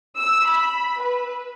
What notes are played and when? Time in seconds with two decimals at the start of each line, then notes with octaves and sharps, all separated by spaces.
0.18 E6
0.47 B5
1.02 B4